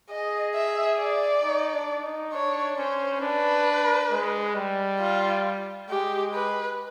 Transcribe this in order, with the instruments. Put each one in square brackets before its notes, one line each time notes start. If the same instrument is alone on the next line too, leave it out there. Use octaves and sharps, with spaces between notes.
[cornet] G#4 [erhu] D#5
[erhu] E5
D5
[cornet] D#4
D4
D#4
[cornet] D4 [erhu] C#5
[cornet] C#4 [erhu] C5
[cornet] D4 [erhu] B4
[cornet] G#3
G3
[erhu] F4
[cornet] G#3 [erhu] G4
[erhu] B4